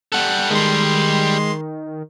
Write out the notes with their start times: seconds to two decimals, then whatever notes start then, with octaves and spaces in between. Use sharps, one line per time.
0.12 G3 A4 F#5 F#6
0.51 D#3 G#3 C6